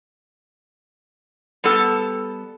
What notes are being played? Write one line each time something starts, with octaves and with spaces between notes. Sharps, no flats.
G3 B3 A4